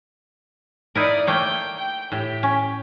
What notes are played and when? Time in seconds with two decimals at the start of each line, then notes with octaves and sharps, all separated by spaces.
0.95 D#4 E4 A#4 D5 D#6
1.27 A3 A#3 C#5 G5
1.78 G5
2.12 A2 G4
2.43 C#4